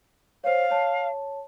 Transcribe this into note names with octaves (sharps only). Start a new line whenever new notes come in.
C5 C#5 F5
C#5 A5